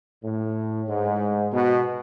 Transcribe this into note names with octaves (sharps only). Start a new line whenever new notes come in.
A2
G#2
B2